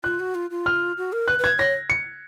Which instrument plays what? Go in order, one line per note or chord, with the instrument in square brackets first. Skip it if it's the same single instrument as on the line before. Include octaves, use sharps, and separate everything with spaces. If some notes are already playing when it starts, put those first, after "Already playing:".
[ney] F4 [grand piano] F#6
[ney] F#4
F4
F4
[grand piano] F6
[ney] F#4
A#4
[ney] B4 [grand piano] F#6
[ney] B4
[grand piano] G#6
[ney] C#5 [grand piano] A#6
[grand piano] C#7